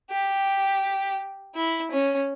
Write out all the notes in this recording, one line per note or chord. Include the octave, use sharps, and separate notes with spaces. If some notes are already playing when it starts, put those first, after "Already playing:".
G4
E4
C#4